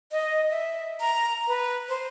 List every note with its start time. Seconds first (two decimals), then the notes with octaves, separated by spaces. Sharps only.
0.12 D#5
0.50 E5
1.00 A#5
1.48 B4
1.89 C5